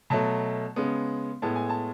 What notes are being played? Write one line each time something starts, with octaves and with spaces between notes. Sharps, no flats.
B2 F#3 A3 A5
C#3 G#3 B3
A2 G#3 B3 A5
G#5
A5